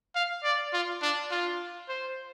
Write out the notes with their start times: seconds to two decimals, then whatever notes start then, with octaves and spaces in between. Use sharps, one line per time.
0.15 F5
0.44 D5
0.73 F4
1.02 D4
1.31 F4
1.89 C5